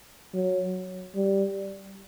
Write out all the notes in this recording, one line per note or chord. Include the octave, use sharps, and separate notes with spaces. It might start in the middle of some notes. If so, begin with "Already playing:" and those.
F#3
G3